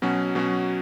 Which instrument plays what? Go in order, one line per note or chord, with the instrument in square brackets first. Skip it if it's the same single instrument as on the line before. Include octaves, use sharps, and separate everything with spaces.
[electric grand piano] B2 F#3 C#4 F#4
B2 F#3 C#4 F#4